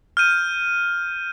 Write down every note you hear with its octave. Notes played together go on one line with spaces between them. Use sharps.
F6 G6 D#7